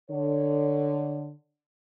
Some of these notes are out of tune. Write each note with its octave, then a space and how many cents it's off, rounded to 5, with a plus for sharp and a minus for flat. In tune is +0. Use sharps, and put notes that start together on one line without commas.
D3 +15 C#5 +20